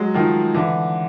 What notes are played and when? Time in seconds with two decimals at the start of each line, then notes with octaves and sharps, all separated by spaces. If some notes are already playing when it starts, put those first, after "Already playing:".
Already playing: F#3 G#3
0.14 D#3 F3
0.54 D3 E3